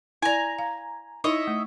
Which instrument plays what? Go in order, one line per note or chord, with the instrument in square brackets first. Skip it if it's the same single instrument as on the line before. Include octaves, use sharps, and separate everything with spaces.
[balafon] E4 D5 [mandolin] G#5 A#5
[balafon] F5
[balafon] D#4 E4 [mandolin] C#5 D#5 E5
[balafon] A3